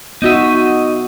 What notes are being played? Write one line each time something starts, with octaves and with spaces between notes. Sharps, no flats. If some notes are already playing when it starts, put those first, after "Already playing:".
B3 D#4 F#4 D#5 E5